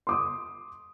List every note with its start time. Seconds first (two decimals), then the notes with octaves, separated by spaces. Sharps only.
0.07 C6 D6 D#6